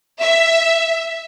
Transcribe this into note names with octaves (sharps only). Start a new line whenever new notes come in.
E5